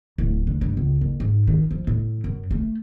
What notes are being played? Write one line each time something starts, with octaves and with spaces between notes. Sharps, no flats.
D1
D3
G2
C#2
F#1
G#2
D#3
F3
A2
F#2
A3